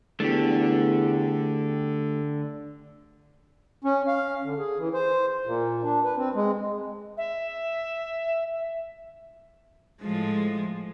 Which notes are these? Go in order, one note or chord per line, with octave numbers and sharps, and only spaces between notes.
E2 D3 A3 G4
C#4
F5
D3
G#4
E3
C5
A#2
D4
B4
C4
G#3
E5
A2 F3 G#3